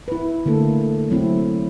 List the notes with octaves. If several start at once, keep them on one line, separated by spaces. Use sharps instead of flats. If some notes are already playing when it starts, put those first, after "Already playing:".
E4 B4
D3 A3 A#3 A4
F#3 A3 C4 E4